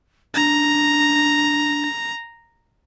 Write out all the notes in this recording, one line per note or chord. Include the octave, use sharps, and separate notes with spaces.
D4 A#5